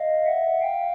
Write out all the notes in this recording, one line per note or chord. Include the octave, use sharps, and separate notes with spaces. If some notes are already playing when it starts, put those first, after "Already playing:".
Already playing: D#5 F5
E5 F#5
F5 G5